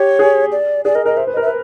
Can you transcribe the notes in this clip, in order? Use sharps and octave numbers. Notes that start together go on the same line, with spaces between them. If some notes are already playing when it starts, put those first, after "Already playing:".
Already playing: G4 C#5
G#4
D5
G#4 D5
A#4 D#5
A#4 D#5
C5 E5
B4
D#5
A#4 E5
B4